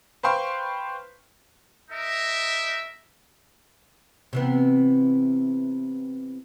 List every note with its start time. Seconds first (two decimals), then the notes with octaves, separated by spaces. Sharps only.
0.23 B4 C5 F5 G5 C6 C#6
1.91 D#4 A#4 D#5 E5
4.33 C3 E3 B3